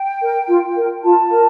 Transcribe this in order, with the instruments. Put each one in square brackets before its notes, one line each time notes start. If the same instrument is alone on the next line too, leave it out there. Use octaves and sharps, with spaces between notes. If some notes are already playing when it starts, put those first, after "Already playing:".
Already playing: [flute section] G5
A#4
F4
A#4
F4 A5
A#4